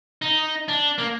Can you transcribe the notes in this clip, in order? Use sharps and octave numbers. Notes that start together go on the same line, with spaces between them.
D#4
D4
A#3